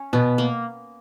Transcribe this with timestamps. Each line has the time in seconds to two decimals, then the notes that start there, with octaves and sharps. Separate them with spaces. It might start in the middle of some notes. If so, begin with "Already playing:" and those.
Already playing: C#4
0.13 B2 B3
0.38 A#3